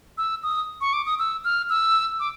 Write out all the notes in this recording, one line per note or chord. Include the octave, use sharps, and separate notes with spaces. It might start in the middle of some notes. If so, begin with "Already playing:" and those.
E6
D#6
C#6
D6
D#6
E6
F6
E6
D6